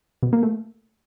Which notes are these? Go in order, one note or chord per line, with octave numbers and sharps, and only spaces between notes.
B2
A#3
A3